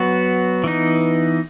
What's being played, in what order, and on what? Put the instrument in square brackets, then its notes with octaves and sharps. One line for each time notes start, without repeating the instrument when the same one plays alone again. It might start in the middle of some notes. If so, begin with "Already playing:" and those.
Already playing: [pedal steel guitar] F#3 B3 F#4
E3 B3 D#4